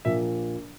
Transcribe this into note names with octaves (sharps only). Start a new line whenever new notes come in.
A#1 A#2 F3 A#3 E5